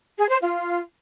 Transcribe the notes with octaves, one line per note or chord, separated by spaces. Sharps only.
G#4
C5
F4